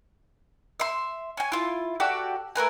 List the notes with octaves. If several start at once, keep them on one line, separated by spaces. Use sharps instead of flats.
E5 C6
C#4 G#5
E4 F4
F#4 G4 A4 D5
A3 A#4 B4 G#5